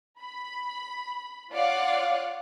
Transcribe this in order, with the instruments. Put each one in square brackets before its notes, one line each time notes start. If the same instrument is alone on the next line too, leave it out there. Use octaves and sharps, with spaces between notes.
[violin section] B5
F4 C#5 D5 F5 F#5